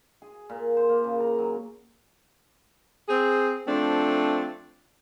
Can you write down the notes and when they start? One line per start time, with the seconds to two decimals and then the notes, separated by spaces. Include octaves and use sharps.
0.22 G#4
0.50 A#2
0.77 C5
0.89 A#3
1.04 C#3
1.20 A#5
1.39 F#3
3.09 C4 G#4
3.67 F3 A3 C4 D4